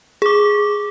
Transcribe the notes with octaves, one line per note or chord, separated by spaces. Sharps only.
G#4 D6